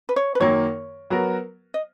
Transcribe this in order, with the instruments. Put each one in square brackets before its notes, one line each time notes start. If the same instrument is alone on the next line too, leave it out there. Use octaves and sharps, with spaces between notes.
[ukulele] B4
C#5
B4
[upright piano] F#2 D#3 F#3 A#3 [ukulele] C#5
[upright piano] F#3 B3 F#4 A#4
[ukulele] D#5